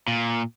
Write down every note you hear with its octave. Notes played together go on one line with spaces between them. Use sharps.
A#2